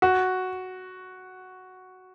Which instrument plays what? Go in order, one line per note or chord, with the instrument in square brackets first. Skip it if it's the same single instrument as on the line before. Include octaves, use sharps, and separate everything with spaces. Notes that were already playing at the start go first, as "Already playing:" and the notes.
[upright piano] F#4